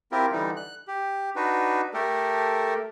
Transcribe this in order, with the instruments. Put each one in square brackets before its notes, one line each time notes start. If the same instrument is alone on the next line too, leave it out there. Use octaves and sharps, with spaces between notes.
[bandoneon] C4 E4 F4 G4 A#4
D3 E3 G3 D#4
F#6
G4
D4 D#4 F#4 B4
A3 G4 A4 A#4